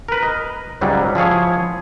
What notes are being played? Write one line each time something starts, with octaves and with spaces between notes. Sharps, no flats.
A#4 B4
D#5
C#2 G#2 F#3 G3
F3 E4 G#4 C#5